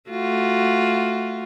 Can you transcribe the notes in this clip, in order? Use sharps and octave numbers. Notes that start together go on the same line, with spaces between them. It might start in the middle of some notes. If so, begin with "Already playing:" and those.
A3 F4 F#4